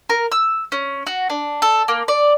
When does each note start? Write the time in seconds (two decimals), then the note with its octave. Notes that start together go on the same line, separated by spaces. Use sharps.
0.10 A#4
0.32 E6
0.72 C#4
1.07 F#4
1.30 D4
1.62 A4
1.88 A#3
2.08 D5